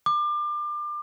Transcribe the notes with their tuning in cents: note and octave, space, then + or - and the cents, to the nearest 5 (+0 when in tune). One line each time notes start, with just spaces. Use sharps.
D6 +30